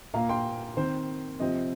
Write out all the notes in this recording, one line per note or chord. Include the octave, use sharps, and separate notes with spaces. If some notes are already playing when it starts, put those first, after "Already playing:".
A#2 A#3 F5 A#5
G5 C6
D#3 C4 C5
C3 F3 C4 D#5